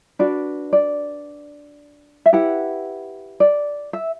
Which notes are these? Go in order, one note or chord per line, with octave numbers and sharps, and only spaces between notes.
D4 F#4 B4 D5
D5
E5
E4 G4 B4 F#5
D5
E5